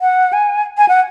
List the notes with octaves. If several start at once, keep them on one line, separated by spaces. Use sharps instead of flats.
F#5
G#5
G#5
F#5